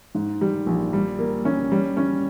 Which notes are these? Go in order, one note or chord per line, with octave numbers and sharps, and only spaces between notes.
G#2
G3
A#1
G3
A#3
C#4
G3
C#4